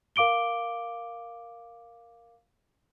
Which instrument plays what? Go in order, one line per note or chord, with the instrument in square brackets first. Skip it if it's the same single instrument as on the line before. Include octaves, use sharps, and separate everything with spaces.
[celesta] A#4 F5 D6 D7 G7